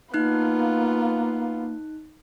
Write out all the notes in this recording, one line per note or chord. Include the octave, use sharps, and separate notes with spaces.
A#3 B3 D#4 F4 F#6